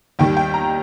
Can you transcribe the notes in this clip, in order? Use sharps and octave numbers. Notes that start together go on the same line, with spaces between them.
D#2 D#3 G3 G5
G5
A#5